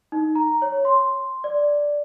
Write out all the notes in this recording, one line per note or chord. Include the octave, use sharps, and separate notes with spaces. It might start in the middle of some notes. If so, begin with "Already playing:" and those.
D#4
A#5
C#5
C6
D5